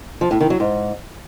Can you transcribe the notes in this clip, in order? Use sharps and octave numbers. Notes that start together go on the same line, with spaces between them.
F3
A2
D#3
F#3
G#2